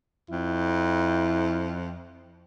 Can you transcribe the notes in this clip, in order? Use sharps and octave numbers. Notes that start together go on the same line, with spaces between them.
F2 E4